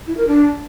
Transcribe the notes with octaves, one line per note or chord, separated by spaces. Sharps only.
E4
A#4
D4